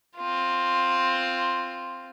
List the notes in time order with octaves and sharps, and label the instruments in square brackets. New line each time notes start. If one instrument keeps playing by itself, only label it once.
[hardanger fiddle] C4 F4